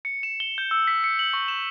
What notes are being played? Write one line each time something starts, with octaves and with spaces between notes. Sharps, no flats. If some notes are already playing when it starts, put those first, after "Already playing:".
C#7
E7
G7
G6
E6
B6
C#7
F#7
C#6
E7